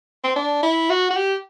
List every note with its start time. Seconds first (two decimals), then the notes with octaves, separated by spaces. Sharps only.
0.24 C4
0.36 D4
0.63 E4
0.90 F#4
1.10 F#4
1.16 G4